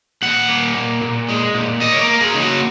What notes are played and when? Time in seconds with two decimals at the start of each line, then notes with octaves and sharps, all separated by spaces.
0.22 A#2 F#5
0.49 A#3
0.75 A#2
1.02 A#2
1.29 G#3
1.54 A#2
1.81 A#3 D#5
1.92 C#5
2.01 A#4
2.07 A#3
2.21 G#4
2.34 C#3 D#4
2.41 F#4